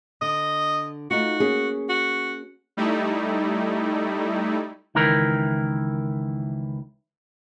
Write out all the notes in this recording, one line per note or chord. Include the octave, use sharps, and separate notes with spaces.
D3 D#5
A3 D#4 F4 F#4
A#3 C#4 G#4
F#4
G3 A3 D#4 E4
C#2 D#3 E3 E4 A#4